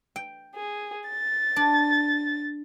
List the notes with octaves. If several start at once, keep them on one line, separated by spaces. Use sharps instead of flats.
G5
G#4
A6
D4